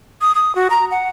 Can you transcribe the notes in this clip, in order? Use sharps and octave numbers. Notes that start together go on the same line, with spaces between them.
D#6
D#6
F#4
A#5
F#5